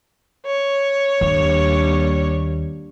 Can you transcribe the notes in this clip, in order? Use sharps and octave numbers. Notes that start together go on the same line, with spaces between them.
C#5
D#2 G3 A#3 D4